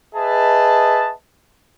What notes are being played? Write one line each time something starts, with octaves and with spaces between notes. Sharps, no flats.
G#4 B4 D#5 E5 A5